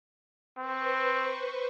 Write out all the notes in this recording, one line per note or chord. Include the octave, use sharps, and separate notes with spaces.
C4 B4 C5 C#6